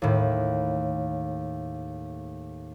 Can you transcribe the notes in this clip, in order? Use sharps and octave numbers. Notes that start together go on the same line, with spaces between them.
D#2 A2